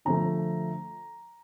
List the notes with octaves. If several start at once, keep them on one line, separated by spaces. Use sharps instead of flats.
D3 F3 A3 A#5